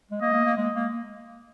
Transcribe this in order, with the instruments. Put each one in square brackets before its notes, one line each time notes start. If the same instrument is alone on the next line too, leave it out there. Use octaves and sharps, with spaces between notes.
[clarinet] G#3
[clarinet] A#3 [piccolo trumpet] D#5
[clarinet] A#3
A#3
G#3
A#3